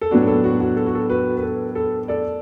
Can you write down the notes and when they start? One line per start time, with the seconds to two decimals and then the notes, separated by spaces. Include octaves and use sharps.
0.01 A4
0.11 A2 F#3 B3 D4 F#4
0.27 A4
0.44 F#4
0.60 F#4
0.77 A4
0.86 F#4
0.95 A4
1.10 F#4 B4
1.37 B4
1.42 A4
1.75 A4
2.08 A4 D5